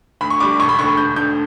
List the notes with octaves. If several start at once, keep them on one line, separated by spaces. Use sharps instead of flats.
D2 B5
C#6
D3 G3 D6
E1 C#6
B5
D2 D3 C#6
E1 G6
D2 D3 G6